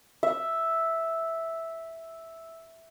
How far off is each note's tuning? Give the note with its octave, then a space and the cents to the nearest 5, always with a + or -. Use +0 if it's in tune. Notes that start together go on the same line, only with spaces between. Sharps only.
E5 -5